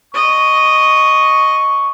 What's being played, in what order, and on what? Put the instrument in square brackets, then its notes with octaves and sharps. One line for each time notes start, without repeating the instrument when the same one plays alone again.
[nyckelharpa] D#5 [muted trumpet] C#6